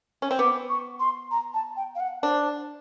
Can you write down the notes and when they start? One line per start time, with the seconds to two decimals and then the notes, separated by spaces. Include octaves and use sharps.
0.22 C#4
0.31 C4
0.39 B3 D6
0.69 C#6
1.00 C6
1.31 A#5
1.54 A5
1.76 G5
1.95 F5
2.00 F#5
2.23 D4 C5